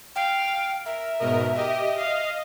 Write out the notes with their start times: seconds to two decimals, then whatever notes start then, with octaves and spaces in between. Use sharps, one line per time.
0.16 F5 G5
0.86 A#4 E5
1.20 G#2 B2 A#4 D#5
1.55 G4 D#5
1.98 F5